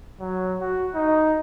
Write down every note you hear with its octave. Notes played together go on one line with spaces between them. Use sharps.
F#3
F#4
D#4